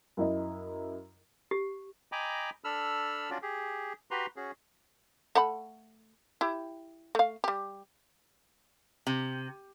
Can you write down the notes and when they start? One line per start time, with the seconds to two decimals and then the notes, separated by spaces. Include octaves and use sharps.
0.17 F#2 E4 D#5
1.51 G4
2.12 D#5 G5 G#5 A#5 B5 D6
2.64 D4 A4 B5 E6 F6
3.30 C#4 D4 F4 F#4 D5
3.42 G4 G#4
4.11 F#4 G4 B4 A#5 C6
4.36 C#4 F#4 G#4
5.35 A3 F#5 B5
6.41 E4 G4
7.15 A3 F5
7.44 G3 G4
9.07 C3